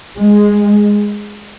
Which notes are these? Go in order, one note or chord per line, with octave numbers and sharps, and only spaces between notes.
G#3